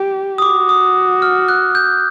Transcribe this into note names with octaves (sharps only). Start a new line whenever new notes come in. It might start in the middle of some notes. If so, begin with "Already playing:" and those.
Already playing: G4
D#6
F#4 D6
D#6
F6
F#6
G6